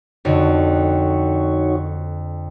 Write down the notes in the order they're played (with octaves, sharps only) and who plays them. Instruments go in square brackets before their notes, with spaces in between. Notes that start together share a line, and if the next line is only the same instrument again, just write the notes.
[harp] F2 D3 [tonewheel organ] D#4 F#4 C#5